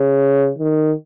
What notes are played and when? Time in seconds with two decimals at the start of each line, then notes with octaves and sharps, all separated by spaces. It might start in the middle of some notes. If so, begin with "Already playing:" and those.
Already playing: C#3
0.58 D#3